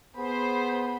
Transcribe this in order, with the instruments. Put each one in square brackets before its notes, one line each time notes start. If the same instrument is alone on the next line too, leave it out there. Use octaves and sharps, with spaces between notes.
[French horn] B3 [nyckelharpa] G#4 [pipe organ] C5 [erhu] B5